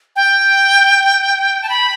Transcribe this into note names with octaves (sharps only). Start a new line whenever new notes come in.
G5
A5
B5